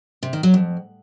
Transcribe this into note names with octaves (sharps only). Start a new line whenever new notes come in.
C3
D#3
F#3
F2